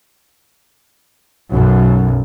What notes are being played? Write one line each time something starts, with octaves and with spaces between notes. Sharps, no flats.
B1 F#2